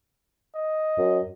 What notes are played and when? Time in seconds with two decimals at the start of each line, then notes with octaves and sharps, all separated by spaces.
0.56 D#5
0.98 F#2